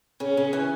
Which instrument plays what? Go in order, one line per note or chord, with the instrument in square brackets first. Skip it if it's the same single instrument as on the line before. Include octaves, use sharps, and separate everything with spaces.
[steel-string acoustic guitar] C#3 [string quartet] C#4
[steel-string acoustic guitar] C#3
E3